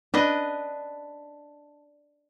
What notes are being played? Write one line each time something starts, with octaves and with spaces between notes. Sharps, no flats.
D4 B4 D#5